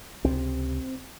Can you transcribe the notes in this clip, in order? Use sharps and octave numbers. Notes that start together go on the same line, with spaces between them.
C#2 C3 C4